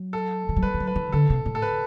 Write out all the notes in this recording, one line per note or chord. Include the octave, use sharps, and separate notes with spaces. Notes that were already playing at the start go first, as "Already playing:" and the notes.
Already playing: F#3
A4
E3
F#3
G3 B4
E3
F#3
B4
E3
D3 A4
C3
A2
A4
B4